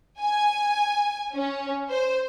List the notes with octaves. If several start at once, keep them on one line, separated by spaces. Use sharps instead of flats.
G#5
C#4
C5